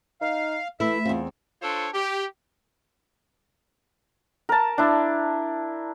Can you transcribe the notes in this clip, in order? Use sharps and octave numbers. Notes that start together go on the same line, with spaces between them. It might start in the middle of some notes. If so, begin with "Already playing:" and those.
D#4 F5
E3 A3 E4 E5
E2 C4 F4
D4 F4 A4 C5 C#5
G4
A#4 A5
D4 E4